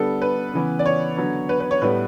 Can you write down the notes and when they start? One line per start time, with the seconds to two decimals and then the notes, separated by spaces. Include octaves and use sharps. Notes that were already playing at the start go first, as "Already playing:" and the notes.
Already playing: D3 G3 B3 A4
0.22 B4
0.53 C#3 E3 B3
0.79 D5
0.86 C#5
1.17 D3 F#3 B3
1.49 B4
1.60 B4
1.71 C#5
1.81 A2 G3 B3 B4